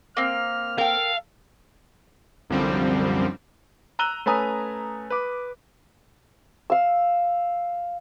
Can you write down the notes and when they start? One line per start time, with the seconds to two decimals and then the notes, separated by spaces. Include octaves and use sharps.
0.17 A#3 C4 F6
0.78 A4 A#4 F5 G5
2.50 C2 F#2 D3 F3 G3 C4
3.99 A#5 E6 F#6 D#7 G7
4.26 A3 C#4 B4 G#5 A#5 D#6
5.10 B4 D6
6.70 F5 E6